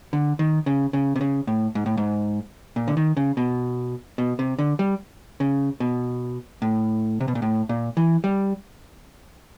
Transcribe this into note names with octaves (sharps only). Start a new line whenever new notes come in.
D3
D#3
C#3
C#3
C3
C#3
A2
G#2
A2
G#2
A#2
D3
D#3
C#3
B2
B2
C3
D3
G3
C#3
B2
A2
C3
B2
A#2
A2
A#2
E3
G3